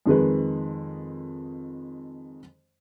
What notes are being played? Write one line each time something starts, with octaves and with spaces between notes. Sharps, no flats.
F2 D#3 G#3 B4